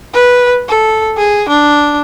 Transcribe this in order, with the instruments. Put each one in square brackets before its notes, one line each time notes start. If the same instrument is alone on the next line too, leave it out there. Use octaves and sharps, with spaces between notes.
[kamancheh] B4
A4
G#4
D4